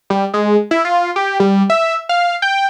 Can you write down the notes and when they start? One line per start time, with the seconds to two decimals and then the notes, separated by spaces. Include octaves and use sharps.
0.10 G3
0.34 G#3
0.71 E4
0.85 F4
1.16 G4
1.40 G3
1.70 E5
2.09 F5
2.42 G5